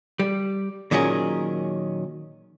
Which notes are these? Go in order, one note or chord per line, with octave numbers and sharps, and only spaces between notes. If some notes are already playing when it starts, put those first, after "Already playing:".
G3
A#2 D#3 F#3 C#4 G#4 A#4